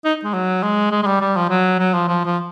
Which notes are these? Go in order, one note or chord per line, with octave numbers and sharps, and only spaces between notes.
D#4
G#3
F#3
G#3
G#3
G#3
G3
G3
F3
F#3
F#3
F3
F3
F3